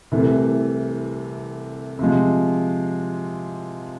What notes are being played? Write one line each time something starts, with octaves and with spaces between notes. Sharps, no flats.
C2 C3 E3 A3
C3 F3 G#3